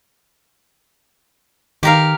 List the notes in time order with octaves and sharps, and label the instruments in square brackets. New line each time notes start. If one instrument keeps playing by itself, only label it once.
[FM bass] D#3 [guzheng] G4 A#4 F5